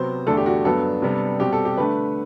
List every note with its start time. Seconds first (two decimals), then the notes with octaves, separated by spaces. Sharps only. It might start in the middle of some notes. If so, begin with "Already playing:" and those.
Already playing: C3 F#3 B3 C5
0.27 E2 D3 A3 D4 A4
0.37 G4
0.46 F#4
0.65 G2 F#3 B3 D4 A4
1.02 C3 G3 B3 D4
1.39 B2 G3 C4 G4
1.52 A4
1.65 G4
1.77 D3 A3 D4 B4